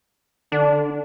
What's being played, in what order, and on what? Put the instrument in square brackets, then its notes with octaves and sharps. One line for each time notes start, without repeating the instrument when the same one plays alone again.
[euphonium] D3 [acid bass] D4